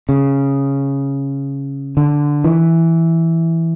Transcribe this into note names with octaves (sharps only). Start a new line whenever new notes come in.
C#3
D3
E3